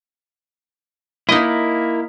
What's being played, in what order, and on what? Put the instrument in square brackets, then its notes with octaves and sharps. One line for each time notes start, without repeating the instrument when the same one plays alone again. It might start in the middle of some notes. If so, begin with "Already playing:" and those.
[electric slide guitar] A#3 E4 [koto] D#4 D#5